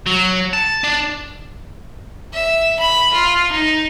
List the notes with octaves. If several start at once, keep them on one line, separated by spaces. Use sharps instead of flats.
F#3
A5
D4
E5
B5
F4
D#4